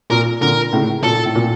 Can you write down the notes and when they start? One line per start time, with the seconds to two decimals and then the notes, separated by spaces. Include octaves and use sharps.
0.11 A#2 A#4
0.42 A#2 D3 A#4
0.73 A2 C#3
1.03 A#2 A4
1.25 A2
1.35 A#2